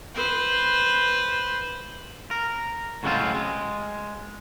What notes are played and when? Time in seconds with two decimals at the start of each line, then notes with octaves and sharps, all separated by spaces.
0.15 B4 C5
2.31 A#4
3.03 A2 C#3 F#3 G#3 C4 F4
3.35 G#3